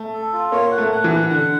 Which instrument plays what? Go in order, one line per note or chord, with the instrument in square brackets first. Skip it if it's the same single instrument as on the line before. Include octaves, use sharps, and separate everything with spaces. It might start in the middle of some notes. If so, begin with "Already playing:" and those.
Already playing: [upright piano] A3
[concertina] A4
F4
[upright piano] A#3 [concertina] C#5
[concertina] F#5
[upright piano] A3
[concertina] F#5
[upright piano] E3
[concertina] F#5
[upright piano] D3 [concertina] F#5